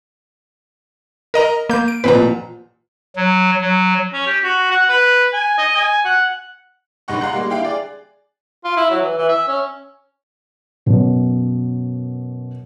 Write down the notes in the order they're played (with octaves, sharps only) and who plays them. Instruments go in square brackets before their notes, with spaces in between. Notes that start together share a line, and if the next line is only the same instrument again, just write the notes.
[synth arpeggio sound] A#4 D#5 A#5
A#3 G6
D7
[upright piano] A1 A#2 F3 [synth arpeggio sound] B4 C5 A#5
[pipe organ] F#3
F#3
[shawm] C#4
G4
F#4
F#5
B4
G#5
D#5
G#5
F#5
[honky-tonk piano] F#1 G2 G#3 D#4 F#5 C#6
F5 F#5 A#5 C6 F#6
G3 G#3 A#3
E4 G4 F5 G5
G#4 D5
[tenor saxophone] F4
E4
F#3
E3
E3
E5
C#4
[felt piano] F#2 B2